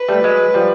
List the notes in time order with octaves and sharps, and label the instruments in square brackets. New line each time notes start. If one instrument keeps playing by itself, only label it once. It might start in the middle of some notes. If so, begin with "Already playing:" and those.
Already playing: [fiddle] B4
[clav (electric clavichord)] G3 A3
F#3 G#3
F3 G3